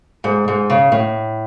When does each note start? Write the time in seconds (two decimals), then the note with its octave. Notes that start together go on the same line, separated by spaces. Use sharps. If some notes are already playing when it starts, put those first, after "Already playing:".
0.24 G#2
0.48 G#2
0.70 C#3
0.92 A2